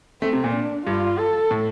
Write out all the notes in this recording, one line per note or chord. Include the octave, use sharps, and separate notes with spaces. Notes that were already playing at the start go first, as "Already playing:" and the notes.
A3 C4
C3
A#2
D4
G2 F4
A4
A2